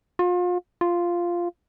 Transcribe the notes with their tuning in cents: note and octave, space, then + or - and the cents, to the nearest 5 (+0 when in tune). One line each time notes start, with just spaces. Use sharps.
F4 +35
F4 -5